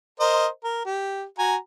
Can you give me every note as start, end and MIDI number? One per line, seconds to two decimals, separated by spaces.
0.20 0.47 70
0.20 0.47 72
0.20 0.47 75
0.64 0.84 70
0.86 1.24 67
1.39 1.56 66
1.39 1.56 80
1.39 1.56 82